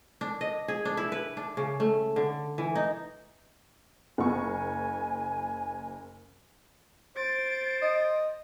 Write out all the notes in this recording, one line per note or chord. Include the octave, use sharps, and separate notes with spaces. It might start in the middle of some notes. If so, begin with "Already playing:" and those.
D4
D#5
G#4
D4
E4
B4
D4
C#3
A3
D3
E3
D#4
F#1 G#5 C#6
C5 A6 D7
D#5